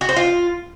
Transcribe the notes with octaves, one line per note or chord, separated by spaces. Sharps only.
F#4
C5
F4